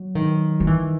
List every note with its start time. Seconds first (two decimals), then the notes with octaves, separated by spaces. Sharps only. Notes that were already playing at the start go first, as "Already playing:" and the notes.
Already playing: F#3
0.15 D#3
0.60 F#3
0.67 E3